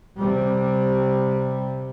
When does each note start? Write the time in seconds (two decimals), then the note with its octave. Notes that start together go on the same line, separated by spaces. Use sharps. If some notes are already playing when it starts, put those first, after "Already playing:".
0.17 C3 G3